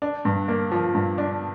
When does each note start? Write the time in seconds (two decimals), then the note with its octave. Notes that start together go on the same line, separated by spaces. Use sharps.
0.02 D4
0.25 G2
0.48 A#3
0.72 F3
0.95 G2
1.18 D4